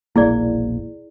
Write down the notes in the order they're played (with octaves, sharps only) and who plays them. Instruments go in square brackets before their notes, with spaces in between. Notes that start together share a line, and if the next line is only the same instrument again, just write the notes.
[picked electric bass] E1 A#1 A#3 [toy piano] E4 G#4 D5